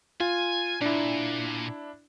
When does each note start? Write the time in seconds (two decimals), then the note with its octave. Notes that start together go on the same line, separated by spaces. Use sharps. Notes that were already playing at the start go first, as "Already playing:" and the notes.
0.20 F4 G#5
0.81 A#2 D4 E4